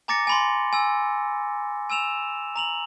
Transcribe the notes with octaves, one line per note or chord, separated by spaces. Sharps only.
G#5 A#5 D6 A6 A#6 C#7
G#5 B5 C6
G#5 E6
G#5 E6 E7 F7
A#5 F7 F#7